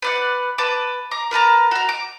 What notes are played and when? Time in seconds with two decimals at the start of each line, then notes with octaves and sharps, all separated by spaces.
0.02 B4 D5 F#5
0.58 B4 A5 D6
1.11 A#5 D6
1.31 A#4 B4 A5 A#5
1.71 F#4 A#5
1.89 D6